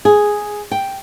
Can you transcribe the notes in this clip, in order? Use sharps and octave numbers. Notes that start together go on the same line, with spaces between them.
G#4
G5